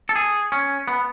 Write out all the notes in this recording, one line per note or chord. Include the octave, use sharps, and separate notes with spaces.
A4
G#4
C#4
B3